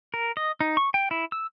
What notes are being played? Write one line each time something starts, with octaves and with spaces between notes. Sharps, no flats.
A#4
D#5
D#4
C#6
G5
E4
E6